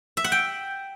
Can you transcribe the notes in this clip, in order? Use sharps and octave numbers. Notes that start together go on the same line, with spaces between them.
E5
F#5
G5